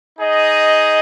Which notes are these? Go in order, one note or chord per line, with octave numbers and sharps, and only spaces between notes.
D#4 G#4 D#5